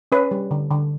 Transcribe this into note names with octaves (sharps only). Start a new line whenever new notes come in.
C#4 B4
G3
D3
D3